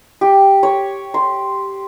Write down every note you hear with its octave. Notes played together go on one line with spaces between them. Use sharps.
G4
C#5
C6